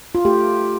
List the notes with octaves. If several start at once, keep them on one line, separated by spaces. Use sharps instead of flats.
F4
A3 G4